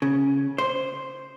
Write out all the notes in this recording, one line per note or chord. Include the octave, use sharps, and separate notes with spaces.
C#3
C5